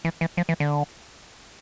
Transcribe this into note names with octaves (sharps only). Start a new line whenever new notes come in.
E3
E3
F3
E3
D3